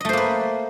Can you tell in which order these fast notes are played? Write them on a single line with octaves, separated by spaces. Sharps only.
D#5 A3 C5 A#3 B4